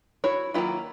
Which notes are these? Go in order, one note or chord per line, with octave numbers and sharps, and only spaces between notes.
E4 F#4 C#5
D#3 F#3 A#3 E4 F4